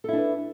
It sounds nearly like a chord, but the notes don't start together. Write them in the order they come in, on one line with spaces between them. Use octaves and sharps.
A4 E4 D4 B4